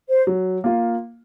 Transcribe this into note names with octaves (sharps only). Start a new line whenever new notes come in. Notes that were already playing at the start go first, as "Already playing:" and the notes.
C5
F#3
A#3 F4